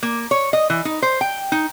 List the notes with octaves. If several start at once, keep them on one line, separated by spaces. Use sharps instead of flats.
A#3
C#5
D#5
E3
D#4
C5
G5
D#4